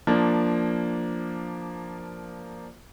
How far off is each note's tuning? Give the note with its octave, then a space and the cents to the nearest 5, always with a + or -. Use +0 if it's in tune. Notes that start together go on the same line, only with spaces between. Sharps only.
F3 +0 A#3 +0 D4 +0